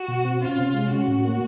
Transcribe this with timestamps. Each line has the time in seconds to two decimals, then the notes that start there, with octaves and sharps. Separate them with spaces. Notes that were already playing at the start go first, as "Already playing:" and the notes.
Already playing: F#4
0.08 B2
0.25 C4
0.41 C#4 F4
0.58 C3
0.74 G#3
0.91 C#4 F#4
1.07 A2
1.25 A#3